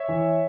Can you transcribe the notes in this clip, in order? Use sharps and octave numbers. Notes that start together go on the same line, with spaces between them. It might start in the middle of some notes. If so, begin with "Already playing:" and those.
Already playing: C#5 E5
E3